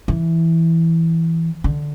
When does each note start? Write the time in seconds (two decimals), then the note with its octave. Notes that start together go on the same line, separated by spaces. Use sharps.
0.08 E3
1.64 D3